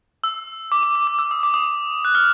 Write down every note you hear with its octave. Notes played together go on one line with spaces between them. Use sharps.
E6
D6
D6
D6
D6
E6
D#6
D6
D#6
F#6
F6